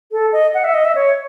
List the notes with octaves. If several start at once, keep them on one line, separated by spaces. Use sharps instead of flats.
A4
D#5
F#5
E5
D#5
E5
C#5